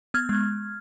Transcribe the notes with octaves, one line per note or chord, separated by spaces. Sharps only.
B3 F6 G#6
G#3